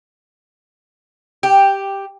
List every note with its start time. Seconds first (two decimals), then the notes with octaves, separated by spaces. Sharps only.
1.43 G4